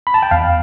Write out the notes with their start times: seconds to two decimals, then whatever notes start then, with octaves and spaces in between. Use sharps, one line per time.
0.07 B5
0.14 A5
0.23 G5
0.31 E2 F5